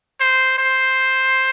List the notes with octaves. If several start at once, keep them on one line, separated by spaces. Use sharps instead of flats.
C5
C5